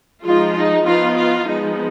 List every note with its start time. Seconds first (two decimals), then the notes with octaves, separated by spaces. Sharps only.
0.24 F3 G#3 D#4 F4
0.55 D#4
0.85 F3 B3 D#4 F4
1.16 F4
1.47 F3 G#3 B3 D#4